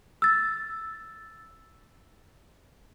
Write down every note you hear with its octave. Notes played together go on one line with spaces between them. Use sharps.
E6 A6